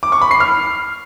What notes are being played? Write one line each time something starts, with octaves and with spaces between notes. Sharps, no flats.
D6
C#6
B5
C7
F6